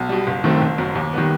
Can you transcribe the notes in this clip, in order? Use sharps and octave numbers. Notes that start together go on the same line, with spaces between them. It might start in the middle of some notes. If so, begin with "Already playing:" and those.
Already playing: B1
B2 G3
F#1
F#2 D#3 A3 C4
F#1
F#2 F#3
D#2
D#3 G3 B3